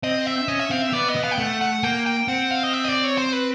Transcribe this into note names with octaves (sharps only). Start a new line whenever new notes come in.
C4 D#5
E5
C#4 D#5
E5
C4 F5
E5
B3 D5
D#5
B3
F5
G5
A3 F#5
F#5
A#3 G5
G5
C4 F#5
F5
D#5
E5
D#5
D5
C#5
C5
B4